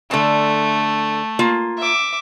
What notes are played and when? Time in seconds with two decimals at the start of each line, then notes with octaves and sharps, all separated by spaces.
0.11 D3 A3 A5
1.39 A#3 F4
1.78 E5 D6